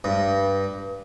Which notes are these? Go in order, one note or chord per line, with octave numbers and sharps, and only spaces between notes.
G2